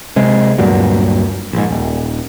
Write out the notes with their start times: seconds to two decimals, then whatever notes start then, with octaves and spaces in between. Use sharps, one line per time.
0.16 C3 G#3
0.58 D2 G2 A#2 F#3
1.53 A#1 G#2
1.70 D#1